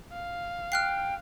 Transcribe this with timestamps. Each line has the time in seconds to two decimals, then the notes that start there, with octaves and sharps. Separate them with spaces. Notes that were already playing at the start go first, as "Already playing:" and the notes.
0.12 F5
0.72 G5 F6 F#6 C7